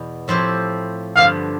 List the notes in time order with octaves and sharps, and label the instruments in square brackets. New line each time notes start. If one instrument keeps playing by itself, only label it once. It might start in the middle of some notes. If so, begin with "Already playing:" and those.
Already playing: [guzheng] E2 B2 B3
A2 F3 C4 E4 G4
[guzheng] G2 D3 F3 B3 [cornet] F5